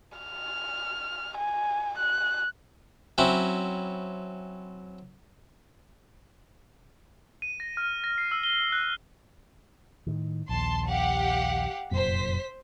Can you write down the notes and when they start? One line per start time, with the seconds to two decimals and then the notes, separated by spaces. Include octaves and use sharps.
0.18 F6
1.38 G#5
1.98 F#6
3.18 F#3 C4 C#4 E4
7.42 D#7
7.60 A#6
7.77 F6
8.04 A#6
8.18 C7
8.31 E6
8.43 G7
8.72 F#6
10.07 A2 D#3
10.49 A#1 D#2 A5 C6
10.88 G4 F5 F#5
11.91 F1 F#2 A#2 C5 B6